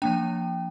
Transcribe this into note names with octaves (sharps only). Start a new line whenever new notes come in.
F3 A#3 D4 G5